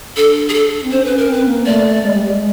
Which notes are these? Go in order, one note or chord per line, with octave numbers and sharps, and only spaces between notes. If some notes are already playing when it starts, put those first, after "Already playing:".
D4 A4
G#4
A4
C4
C#4 C5
C#4 B4
A#4
C4 B4
A#3
A3 D5
G#3
G3
G#3